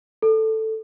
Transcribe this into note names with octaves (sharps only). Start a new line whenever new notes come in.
A4